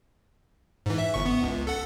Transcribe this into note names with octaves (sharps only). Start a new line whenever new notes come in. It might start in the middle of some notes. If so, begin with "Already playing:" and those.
G#2 E3
E5
G1 C#6
B3
C#2
A4 F#5